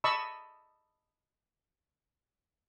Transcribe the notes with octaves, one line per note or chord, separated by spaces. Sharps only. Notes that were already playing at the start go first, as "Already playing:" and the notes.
D#5 A5 B5 C#6 E6